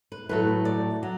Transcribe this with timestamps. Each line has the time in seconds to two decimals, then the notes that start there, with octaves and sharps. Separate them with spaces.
0.12 B4
0.29 A2 F#3 A3 B4
0.65 D5
1.03 F#3